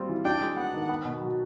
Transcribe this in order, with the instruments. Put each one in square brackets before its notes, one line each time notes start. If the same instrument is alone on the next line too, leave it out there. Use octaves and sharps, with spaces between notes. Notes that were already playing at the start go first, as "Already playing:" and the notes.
Already playing: [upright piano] G3 C4 F4
E3
[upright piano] D4 [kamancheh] G5
[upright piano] G#3
[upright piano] B3 [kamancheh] F#5
[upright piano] D#3
B3
B2
F#3